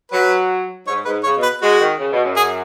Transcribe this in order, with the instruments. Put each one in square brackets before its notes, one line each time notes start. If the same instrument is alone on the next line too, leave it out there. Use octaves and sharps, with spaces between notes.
[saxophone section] F#3 [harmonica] B4
[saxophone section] G#2 [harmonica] C#5
[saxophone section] G#2 [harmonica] B4
[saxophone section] C#3 [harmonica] C#5
[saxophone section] B2
[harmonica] B4
[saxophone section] G#3 [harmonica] F#4
[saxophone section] D#3
C#3
B2
F#2
[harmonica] G#4